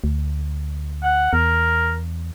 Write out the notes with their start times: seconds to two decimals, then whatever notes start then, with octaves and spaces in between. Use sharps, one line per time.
0.04 D2
1.03 F#5
1.33 E2 A#4